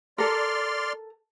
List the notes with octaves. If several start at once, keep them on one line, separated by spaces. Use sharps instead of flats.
A4 A#4 D5 C6 F6